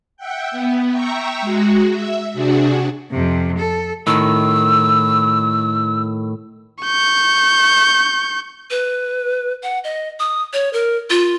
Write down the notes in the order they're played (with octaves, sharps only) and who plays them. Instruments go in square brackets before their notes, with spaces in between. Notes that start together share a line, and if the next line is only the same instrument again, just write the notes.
[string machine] E5 F#5 G5
B3
E5 G5 A#5 C#6 E6
G#3 F#4
E5
C3 D4 F#4 G#4
[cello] F2 C3
A4
[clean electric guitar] A2 D#3 [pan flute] E6
[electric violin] C#6 G6
[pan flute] B4
F#5
D#5
D#6
C#5
A#4
F4